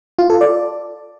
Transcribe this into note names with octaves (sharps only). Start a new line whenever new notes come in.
F4
A4
D5